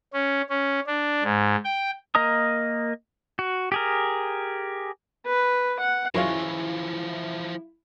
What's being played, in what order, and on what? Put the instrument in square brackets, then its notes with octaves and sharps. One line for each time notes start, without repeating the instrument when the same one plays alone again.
[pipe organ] C#4
C#4
D4
G#2
G5
[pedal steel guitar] A#3 A#4 D#5 A#5 D#6
F#4
G4 G#4 A#4
[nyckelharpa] B4
F#5
[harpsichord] F#2 [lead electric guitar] E3 F3 [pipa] G#3 C#4 F4 [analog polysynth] E4